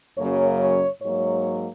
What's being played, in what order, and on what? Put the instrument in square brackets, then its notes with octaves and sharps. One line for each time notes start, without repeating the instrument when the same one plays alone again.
[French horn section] F#2 C#3 F#3 A#3 C#5
C#5
G#2 F#3 A#3 C#5